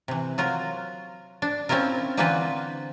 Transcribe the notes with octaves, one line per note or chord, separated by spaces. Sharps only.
C3 E3
F#3 F4 A#4
D4
C4 C#4 E4 F4 A#4
D3 E3 A#3 C4 F4 B4